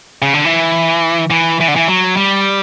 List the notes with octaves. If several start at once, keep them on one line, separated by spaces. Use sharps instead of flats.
C#3
D3
E3
E3
E3
D3
E3
F#3
G3